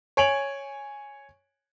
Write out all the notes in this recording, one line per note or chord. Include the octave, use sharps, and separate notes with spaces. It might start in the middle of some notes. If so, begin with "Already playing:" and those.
C#5 G#5 D7 F7 F#7